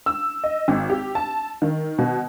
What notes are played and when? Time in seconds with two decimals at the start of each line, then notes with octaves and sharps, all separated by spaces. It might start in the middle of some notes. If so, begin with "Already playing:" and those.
0.06 E6
0.44 D#5
0.68 G#1
0.90 G4
1.15 A5
1.62 D#3
1.98 B2